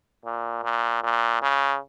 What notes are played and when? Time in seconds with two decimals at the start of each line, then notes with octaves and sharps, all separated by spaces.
0.25 A#2
0.64 A#2
1.03 A#2
1.42 C#3